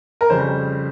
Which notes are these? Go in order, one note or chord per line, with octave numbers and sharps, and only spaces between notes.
A#4
F2 C#3 G3 C5